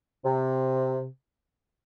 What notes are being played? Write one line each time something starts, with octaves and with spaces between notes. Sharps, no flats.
C3